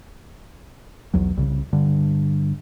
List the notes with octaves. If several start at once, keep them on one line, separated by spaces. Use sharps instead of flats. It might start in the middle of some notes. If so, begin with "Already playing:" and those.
B1 E2 F#3
C2 C#3
G2 D3